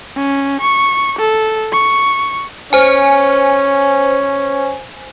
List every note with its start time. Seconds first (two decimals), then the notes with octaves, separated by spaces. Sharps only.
0.16 C#4
0.61 C#6
1.19 A4
1.72 C#6
2.73 C#4 C5 G#5